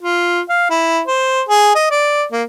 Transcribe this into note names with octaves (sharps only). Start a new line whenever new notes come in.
F4
F5
E4
C5
G#4
D#5
D5
A#3